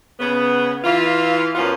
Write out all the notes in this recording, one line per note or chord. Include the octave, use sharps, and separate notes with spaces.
C#3 B3
E3 F4
F#2 F3 B3 C#4 F4